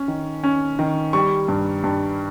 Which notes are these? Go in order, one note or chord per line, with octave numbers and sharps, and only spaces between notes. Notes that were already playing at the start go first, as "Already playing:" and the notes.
Already playing: C#4
D#3
C#4
D#3
G3 C#6
G2
G2